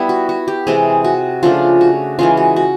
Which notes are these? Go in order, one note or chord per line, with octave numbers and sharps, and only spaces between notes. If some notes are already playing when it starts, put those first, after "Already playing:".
Already playing: G3 B3 E4
F#4
F#4
G4
C3 E3 G#3 C4 G#4
F#4
C#3 F3 A3 D4 F4
F#4
E3 G#3 C#4 F4
F#4
F#4